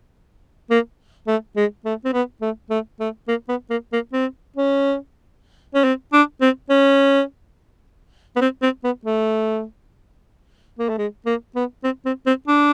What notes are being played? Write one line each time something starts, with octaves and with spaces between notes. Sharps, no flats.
A#3
A3
G#3
A3
C4
B3
A3
A3
A3
A#3
B3
A#3
A#3
C4
C#4
C#4
C4
D4
C4
C#4
B3
C4
C4
B3
A3
A#3
A3
G#3
A#3
B3
C4
C4
C4
D4